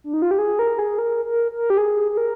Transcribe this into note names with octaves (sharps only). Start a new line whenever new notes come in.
D4
D#4
F4
G4
G#4
A#4
G#4
A#4
A#4
A#4
G4
G#4
G#4
A#4